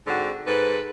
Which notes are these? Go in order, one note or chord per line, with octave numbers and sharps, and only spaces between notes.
G#2 D3 C4 F#4
G#2 A4 B4